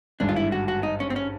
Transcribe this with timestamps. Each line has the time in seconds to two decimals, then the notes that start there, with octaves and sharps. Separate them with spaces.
0.20 G#1 G2 D3 D4
0.29 F4
0.36 E4
0.52 F#4
0.68 F#4
0.83 D#4
1.00 C#4
1.10 C4
1.16 C#4